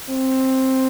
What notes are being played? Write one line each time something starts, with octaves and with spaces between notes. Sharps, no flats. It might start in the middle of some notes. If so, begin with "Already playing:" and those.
C4